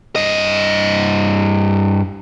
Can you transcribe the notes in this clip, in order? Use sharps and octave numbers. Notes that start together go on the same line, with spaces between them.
G2 D#5